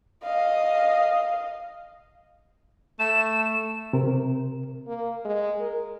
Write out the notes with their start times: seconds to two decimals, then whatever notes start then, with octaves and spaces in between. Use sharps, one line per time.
0.24 D#5 F5
2.99 A3 E7
3.93 C3 A#4
4.87 A#3
5.25 G#3
5.61 A#4